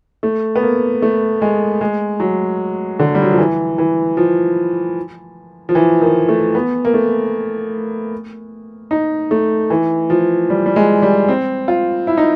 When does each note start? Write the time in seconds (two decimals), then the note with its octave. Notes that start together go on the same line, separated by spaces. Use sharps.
0.23 A3
0.56 B3
0.63 A#3
1.02 A3
1.42 G#3
1.81 G#3
2.20 F#3
2.99 D3
3.15 G3
3.22 F#3
3.31 F3
3.38 E3
3.78 E3
4.17 F3
5.69 F3
5.75 E3
6.01 D#3
6.28 A3
6.55 B3
6.85 A#3
6.94 A3
8.91 D#4
9.31 A3
9.70 E3
10.10 F3
10.50 G3
10.66 G3
10.76 G#3
11.02 G3
11.29 C4
11.68 F4
12.07 E4
12.17 D#4